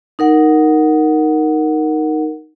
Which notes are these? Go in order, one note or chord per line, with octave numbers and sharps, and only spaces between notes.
D#4 A#4 F#5